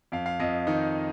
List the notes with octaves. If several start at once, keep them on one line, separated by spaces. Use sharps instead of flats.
F2 F5
F5
F2 D#5
D#3 D#4